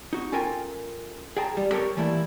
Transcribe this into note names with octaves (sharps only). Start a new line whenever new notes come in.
D#4 F#4
C#4 F4 A4 A#4 G5 G#5
G#4 G5 A5 A#5
G3
G4 A4 A#4 C#5
E3 G3 A3 A#3 E4